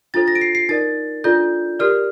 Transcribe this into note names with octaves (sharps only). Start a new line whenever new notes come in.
D4 F4 A4 C5 A6
A#6
D7
C7
C7
D#4 A#4 D5 A6
D4 F4 A4 D5 G6
G4 A#4 D5 F6